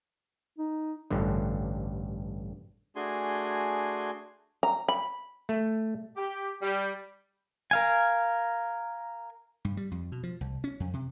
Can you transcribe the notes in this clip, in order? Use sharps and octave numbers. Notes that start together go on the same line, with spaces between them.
D#4
A1 G2 D3
A3 D4 F#4 G#4 G#5 C6
A#5
B5
A3
G4
G3
A#4 F5 G#5
G2
G3
F2
B2
F3
C2
C#4
F2
C3